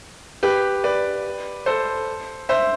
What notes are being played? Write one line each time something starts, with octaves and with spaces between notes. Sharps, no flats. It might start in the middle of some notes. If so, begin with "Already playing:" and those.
G4 B4
B4 D5
A4 C5
C5 E5